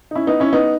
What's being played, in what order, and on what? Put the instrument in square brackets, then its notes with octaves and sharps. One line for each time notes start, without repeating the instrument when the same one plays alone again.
[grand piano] D#4
C#4 E4
B3 D#4
C#4 E4
B3 D#4